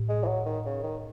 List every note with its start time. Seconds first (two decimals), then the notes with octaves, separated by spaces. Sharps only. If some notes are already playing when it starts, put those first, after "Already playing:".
Already playing: A2
0.09 G#3
0.23 E3
0.27 F#3
0.46 D#3
0.65 C#3
0.83 D#3